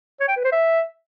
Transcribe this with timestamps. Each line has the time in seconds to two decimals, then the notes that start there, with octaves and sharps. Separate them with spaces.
0.20 C#5
0.28 G5
0.36 B4
0.44 C5
0.52 E5